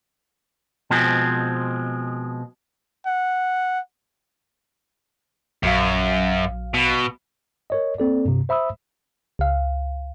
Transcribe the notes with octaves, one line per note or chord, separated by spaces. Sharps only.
B2 F3 G#3 C4
F#5
A#1 F#2 F#3 F5
B2
A#4 C#5 D#5
A#3 C4 A4 D5
G2 C3
C5 E5 B5 D#6 E6
C#2 F5